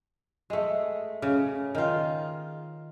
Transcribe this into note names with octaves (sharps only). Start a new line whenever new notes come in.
G#3 A3
C#3
D#3 F4